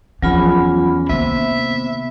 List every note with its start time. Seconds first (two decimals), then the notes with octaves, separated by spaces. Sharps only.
0.22 E2 F3 F#3 C4 C#4 F4 F#5 B5
1.09 C3 D#3 A#3 B3 E5